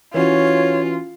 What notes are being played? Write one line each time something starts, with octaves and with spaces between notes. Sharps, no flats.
E3 C#4 F4 F#4 C#5